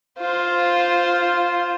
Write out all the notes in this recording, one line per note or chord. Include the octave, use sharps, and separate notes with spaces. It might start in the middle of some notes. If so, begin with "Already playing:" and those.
F4 C5